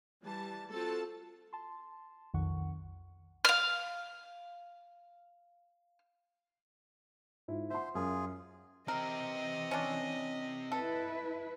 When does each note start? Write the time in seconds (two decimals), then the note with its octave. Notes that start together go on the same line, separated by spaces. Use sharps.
0.23 E3 G3 A5
0.71 C4 F4 F#4 A4 A5
1.53 A5 C6
2.34 B1 F2 D#3 F#5 C#6
3.45 F5 F6
7.48 G#2 E4 F4
7.70 C5 E5 F#5 C6
7.95 F#2 F4 G#4
8.88 E3 C4 G4 A#4 D#5
9.71 C#4 D4
10.72 E4 A4 B4